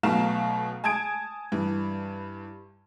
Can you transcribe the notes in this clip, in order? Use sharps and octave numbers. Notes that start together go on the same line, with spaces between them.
B1 B2 A3 F5 A#5 E7
G#5 A5 D#6 G#6 D7
G2 E3